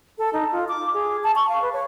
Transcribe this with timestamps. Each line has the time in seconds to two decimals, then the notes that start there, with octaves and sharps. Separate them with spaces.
0.18 A4
0.33 D#4
0.52 F4
0.69 D6
0.94 G#4
1.24 A5
1.36 C#6
1.49 F5
1.62 B4
1.73 C#5